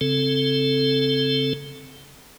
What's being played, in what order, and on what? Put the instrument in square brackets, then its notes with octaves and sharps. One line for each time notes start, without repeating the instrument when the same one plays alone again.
[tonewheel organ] C#3 C4 A4